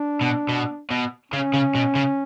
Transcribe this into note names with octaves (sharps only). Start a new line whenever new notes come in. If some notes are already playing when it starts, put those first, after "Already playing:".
Already playing: D4
B2
B2
B2
C#3 C#4
C#3
B2
C#3